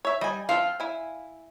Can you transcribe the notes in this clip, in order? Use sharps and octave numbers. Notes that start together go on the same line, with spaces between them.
C#5 E5
G3 D#5 G#5
F3 C4 F4 F5
E4 G#5